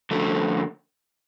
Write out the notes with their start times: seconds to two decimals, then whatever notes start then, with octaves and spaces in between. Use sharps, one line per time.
0.11 F2 D3 A3